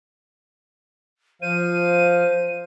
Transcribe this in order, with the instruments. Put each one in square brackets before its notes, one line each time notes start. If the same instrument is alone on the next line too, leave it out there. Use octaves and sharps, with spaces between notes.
[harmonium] F3 F5 [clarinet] C5 [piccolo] D#7